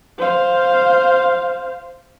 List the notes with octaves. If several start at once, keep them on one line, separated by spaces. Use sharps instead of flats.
C5 F5